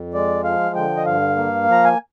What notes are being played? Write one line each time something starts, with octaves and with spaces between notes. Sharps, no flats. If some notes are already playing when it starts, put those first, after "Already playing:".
Already playing: F2
G#3 D5
F3 F5
D3 G5
D#5
G2 F5
A#3
F3 A#5
G#5